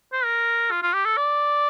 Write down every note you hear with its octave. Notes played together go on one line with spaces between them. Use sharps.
C5
A#4
F4
F4
G4
A4
D5